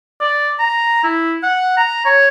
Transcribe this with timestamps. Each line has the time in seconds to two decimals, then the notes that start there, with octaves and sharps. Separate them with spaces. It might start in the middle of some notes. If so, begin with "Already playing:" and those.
0.20 D5
0.59 A#5
1.03 E4
1.43 F#5
1.77 A#5
2.05 C#5